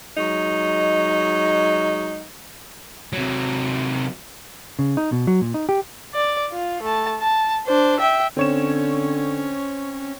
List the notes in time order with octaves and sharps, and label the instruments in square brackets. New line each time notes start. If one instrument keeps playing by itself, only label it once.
[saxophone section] F#3 G#3 D#4
[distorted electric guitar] C3 F#3
[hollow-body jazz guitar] C#3
D#4
B2
F#3
A#2
D#4
G4
[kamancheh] D5
F4
A3 A5
A5
D4 C5
E5 G5
[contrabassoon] D3 [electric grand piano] C4 C#5 E7 [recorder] C#4